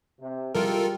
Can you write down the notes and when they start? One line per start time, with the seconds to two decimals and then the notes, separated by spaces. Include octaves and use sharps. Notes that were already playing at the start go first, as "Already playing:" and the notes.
0.20 C3
0.55 G3 G#3 E4 F4 G4 A4 A#4